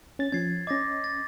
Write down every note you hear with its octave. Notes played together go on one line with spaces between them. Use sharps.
C#4 A6
F3 C#4 G#6 A6 C7
C#4 D#5 D6 A6 A#6
A6